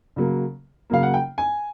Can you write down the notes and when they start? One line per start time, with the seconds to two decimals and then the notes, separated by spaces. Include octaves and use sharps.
0.16 C#3 F#3 A#3
0.90 C#3 F#3 A#3 F5
1.03 F#5
1.14 G5
1.38 G#5